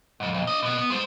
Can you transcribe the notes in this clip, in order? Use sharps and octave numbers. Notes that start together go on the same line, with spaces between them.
F2 G#2
B1 F2
D4 D#5
B2 B3
B3
G#3 C5